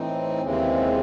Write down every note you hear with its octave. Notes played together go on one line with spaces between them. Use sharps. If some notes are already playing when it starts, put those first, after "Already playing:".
Already playing: A2 E3 C4 D#4
D#2 C#3 E3 G#3 C4